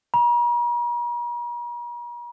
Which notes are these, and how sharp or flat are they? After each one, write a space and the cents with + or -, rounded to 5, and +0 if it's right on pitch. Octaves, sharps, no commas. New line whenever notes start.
A#5 +45